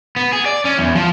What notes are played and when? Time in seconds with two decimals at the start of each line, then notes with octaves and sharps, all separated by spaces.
0.16 B3
0.33 G#4
0.46 D5
0.65 C#4
0.78 E2
0.95 F3